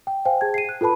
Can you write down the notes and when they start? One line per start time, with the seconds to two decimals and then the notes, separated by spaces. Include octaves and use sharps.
0.07 G5
0.25 C5 F5 G5 G#5
0.41 G#4 A5 G#6
0.54 C7 D#7
0.69 F#6
0.81 F4 A4 B4 A5 B5